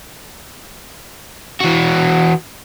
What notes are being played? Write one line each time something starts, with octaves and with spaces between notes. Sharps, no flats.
E3 F#4